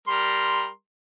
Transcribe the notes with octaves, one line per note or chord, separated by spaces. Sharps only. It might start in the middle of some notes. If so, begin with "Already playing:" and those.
G3 A#4 C6